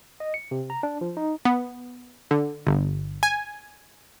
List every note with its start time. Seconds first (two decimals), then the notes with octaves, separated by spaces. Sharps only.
0.20 D#5
0.34 C#7
0.51 C3
0.70 A#5
0.83 D4
1.01 F3
1.17 D#4
1.45 B3
2.31 D3
2.67 G1
3.23 G#5